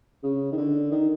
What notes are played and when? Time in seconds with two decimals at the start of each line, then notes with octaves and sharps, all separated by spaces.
0.23 C#3
0.52 D#3
0.58 D3
0.92 D#3